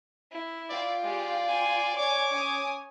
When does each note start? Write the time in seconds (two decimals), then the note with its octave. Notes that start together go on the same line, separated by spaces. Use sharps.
0.31 E4
0.69 F4 D5 G5
1.04 G#3 G4 D5
1.48 G#5 C6
1.97 C#5 D5 G#5 D6 G#6
2.29 C#4 G#5 D#6